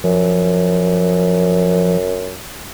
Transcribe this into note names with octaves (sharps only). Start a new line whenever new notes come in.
F#2 F3